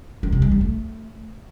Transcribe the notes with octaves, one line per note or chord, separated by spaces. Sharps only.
D#3
C3
G#3
G3
A3